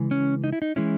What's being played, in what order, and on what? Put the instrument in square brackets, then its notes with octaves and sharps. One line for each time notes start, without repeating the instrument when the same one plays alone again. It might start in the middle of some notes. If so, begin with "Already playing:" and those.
Already playing: [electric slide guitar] C#3 E3 G#3
C#4
D#4
E4
D#4
E3 G#3 C#4 E4